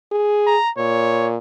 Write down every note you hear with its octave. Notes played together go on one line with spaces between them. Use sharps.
G#4
A#5
A#2 C#5